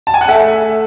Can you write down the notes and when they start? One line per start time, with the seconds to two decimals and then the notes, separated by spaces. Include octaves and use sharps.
0.07 A5
0.14 G#5
0.21 F#5
0.28 A3 E5